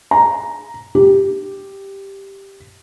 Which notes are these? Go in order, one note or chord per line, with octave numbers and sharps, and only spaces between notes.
A#5
G4